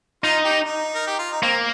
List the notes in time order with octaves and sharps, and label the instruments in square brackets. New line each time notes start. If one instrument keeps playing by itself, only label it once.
[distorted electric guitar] D#4 [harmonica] F4
[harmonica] G4
D#4
A#4
G4
F4
D#4
[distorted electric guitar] A#3 [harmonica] C4